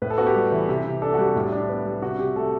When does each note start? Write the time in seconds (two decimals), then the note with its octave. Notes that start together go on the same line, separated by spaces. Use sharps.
0.02 A2 B4
0.10 A4
0.18 B3 F#4
0.27 G4
0.35 G3
0.52 E3
0.69 C3
0.85 C3
1.02 D4 A4
1.14 F#4
1.18 G3 G4
1.36 A2
1.52 D4
1.69 B3
1.86 G3
2.02 C3 F#4
2.19 C3 G4
2.36 A3 A4